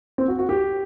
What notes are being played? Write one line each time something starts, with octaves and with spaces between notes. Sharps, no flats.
C4
F#4
F#4
G4